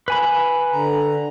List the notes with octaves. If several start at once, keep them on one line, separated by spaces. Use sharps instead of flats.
B4 G#5 B5
D3 A#5